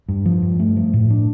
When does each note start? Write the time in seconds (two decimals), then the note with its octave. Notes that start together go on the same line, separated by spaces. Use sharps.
0.09 G2
0.26 F3
0.42 G2
0.60 A3
0.77 F3
0.94 A2
1.10 D4